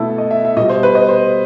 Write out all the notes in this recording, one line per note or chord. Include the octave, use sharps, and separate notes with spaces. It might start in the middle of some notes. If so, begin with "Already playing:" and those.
Already playing: B2 A3 E4 A4
D#5
E5
E5
B2 G3 D#5
C5
B4
D#5
C5